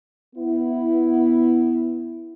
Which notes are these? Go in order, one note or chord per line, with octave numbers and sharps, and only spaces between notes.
B3 E4